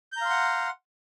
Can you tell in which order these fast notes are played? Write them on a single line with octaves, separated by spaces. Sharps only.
G6 A#5 F5 C6 F#5